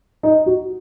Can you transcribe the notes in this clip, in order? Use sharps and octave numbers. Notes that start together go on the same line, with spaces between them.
D#4
F#4